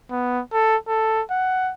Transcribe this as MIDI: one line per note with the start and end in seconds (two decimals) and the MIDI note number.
0.11 0.41 59
0.53 0.76 69
0.88 1.22 69
1.31 1.72 78